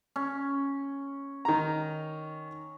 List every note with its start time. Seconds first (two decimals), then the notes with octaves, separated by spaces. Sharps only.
0.16 C#4
1.45 D#3 A#5